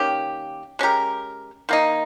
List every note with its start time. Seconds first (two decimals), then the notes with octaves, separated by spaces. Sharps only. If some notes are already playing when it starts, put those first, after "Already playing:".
Already playing: D#3 A#3 C#4 G4
0.79 G#3 C#4 G4 A#4
1.69 D#3 A#3 D#4